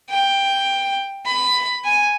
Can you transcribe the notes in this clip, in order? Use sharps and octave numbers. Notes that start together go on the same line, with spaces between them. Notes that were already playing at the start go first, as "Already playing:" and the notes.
G5
B5
G#5